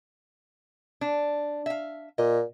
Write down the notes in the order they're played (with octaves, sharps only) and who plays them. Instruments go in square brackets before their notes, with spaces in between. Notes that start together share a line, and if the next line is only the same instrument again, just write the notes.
[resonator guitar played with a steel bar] D4
E5 F5
[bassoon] A#2 [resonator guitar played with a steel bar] D#5